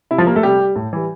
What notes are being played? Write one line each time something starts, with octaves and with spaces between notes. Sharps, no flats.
C3 E4
F3 F4
G3 A#3 A#4
A3 A4
C3 G3 G4
G3
A2
E3 G3